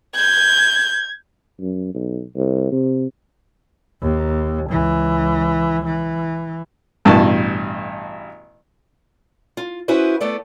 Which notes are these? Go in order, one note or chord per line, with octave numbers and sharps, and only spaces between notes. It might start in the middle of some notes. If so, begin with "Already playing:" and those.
G6 G#6
F#2
B1
C2
C3
D#2
C#2 E3
E3
A1 G2 B2 E3 A5 C#6
F4
C#4 E4 F#4 G#4 B4 C5
A3 B3 A4 D5